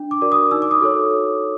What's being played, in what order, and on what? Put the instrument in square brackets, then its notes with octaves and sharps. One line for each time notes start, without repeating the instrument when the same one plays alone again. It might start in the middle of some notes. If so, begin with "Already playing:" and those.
Already playing: [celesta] D4
D6
F#4 A#4 D5
D#6
D#4 E6
D6
D#6
F#4 A4 C#5